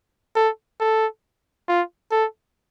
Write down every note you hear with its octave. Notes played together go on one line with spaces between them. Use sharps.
A4
A4
F4
A4